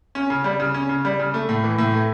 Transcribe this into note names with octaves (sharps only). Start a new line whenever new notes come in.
C#4
C#3
G3
C#3
C#4
C#3
G3
C#3
A3
A2
E3
A2
A3